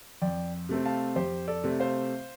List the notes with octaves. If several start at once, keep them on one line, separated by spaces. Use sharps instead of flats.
F2 D5 G5
C3 A3 C4
F5 A5
F2 G4 C5
A4 D5
C3 A3 C4
C5 F5